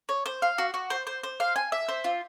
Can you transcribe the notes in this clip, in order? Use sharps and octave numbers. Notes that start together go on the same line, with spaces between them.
C#5
C5
F5
F#4
F#4
C5
C5
C5
F5
G#5
E5
C5
F4